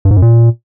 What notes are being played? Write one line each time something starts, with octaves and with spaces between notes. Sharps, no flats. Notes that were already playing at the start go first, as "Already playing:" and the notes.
G2
G#2
F#2
A#2